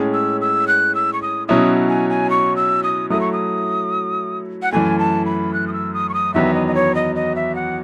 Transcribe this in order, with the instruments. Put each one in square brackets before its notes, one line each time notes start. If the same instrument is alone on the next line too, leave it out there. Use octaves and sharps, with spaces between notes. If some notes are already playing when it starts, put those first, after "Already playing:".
Already playing: [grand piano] A2 G#3 C#4 G#4
[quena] E6
E6
F#6
E6
C#6
D#6
[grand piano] B2 F#3 C#4 E4 [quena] D#6
[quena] G#5
G#5
C#6
E6
D#6
[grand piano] F#3 A3 E4 [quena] D#6
[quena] C#6
D#6
F#5
[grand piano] F#2 E3 A3 [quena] G#5
[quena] A5
B5
F#6
D#6
E6
D#6
C#6
D#6
[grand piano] E2 D#3 F#3 B3 [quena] E5
[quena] D#5
D#5
C#5
D#5
D#5
E5
F#5